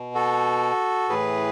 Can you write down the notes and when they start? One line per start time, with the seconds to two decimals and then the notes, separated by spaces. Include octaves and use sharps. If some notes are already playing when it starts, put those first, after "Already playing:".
Already playing: B2
0.15 F#4 A4
1.09 A2 E3 G#4 B4